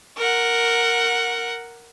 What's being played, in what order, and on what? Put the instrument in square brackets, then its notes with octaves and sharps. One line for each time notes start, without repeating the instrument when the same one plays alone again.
[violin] A#4 F#5